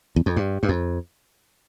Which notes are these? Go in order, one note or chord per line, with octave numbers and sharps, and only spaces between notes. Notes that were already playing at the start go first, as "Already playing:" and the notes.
E2
F2
G2
G2
F2